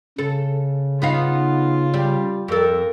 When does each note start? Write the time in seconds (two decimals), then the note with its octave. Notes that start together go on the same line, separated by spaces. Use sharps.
0.18 C#3 A4
1.02 B3 D#4 F4 F5
1.94 G3
2.48 F2 A4 A#4